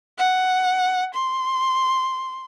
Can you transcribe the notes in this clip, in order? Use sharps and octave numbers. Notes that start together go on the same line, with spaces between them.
F#5
C6